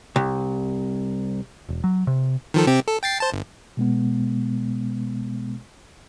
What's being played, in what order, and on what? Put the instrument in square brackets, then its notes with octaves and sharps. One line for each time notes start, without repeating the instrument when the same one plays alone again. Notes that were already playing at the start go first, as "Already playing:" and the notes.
[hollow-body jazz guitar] C2
[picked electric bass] E1
F#3
C3
[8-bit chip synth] D#3 F3 A4
C3 C4 G4
A4
G5 A6 C7
C5 A5
G1
[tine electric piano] B2 G#3 B3